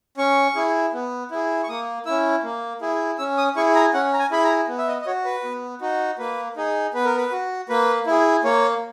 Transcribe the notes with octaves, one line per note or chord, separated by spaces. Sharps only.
C#4 C#6
E4 G#4
B3
E4 G#4
C#6
A#3 D#6
C#4 E4 E6
A#3
E4 G#4
C#4 E6
D#6
E4 G#4 C#6
A#5
C#4 F#5
A#5
G#5
E4 G#4 B5
A#5
B3
E5
D#5
D#5
F#4 C#5
B4
B3
D#4 F#4
A#3 B4
D#4 G#4
B3 B4
A#4
B4
F#4
A#3 B4
E4 G#4
A#3 C#5